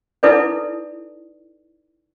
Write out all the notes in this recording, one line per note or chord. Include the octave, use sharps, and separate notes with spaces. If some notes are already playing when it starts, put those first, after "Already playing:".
D#4 E4 A4 B4 D5